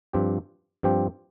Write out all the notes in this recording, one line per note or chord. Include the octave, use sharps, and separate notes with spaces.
G2 F3 C4 G4
G2 F3 C4 G4